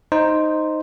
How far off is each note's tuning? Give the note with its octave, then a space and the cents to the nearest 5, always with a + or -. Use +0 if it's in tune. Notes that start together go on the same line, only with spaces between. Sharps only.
D#4 +0 C5 +0